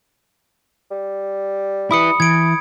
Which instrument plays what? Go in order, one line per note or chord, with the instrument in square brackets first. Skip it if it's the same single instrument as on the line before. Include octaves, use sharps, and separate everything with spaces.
[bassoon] G3
[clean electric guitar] E4 B4 [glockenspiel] B5 D#6 C#7
[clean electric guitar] E3 [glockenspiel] G#6 D7